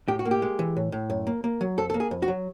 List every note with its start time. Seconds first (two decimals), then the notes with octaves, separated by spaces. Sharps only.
0.08 A2 G4
0.19 F#4
0.25 A#3
0.31 G4
0.42 G#3
0.59 E3
0.76 A2
0.92 A2
1.10 F#2
1.27 A#3
1.44 A#3
1.61 F#3
1.78 F2 A4
1.90 A#3 A4
2.00 G#4
2.11 F2
2.22 F#4
2.28 F#3